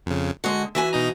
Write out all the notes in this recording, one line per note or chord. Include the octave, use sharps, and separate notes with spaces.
F2 C#3
D3 G#3 F#4 C#7
E3 F#4 E5 G#5
B2 D#4 A#5